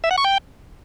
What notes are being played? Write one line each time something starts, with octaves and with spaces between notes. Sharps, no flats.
E5
F#5
C#6
G5